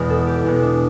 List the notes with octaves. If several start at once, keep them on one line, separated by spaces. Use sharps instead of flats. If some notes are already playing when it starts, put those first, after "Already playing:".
Already playing: E2 B2 G#3 B3
A4
G4
E2 B2 G#3 B3
D4